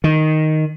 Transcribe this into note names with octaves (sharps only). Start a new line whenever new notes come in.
D#3